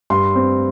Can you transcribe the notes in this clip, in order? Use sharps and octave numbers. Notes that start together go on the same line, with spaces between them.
G2 C6
C4